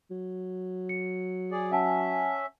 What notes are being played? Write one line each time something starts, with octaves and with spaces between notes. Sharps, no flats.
F#3
C#7
G#4 D5
C#4 E5 F#5 G#5 A5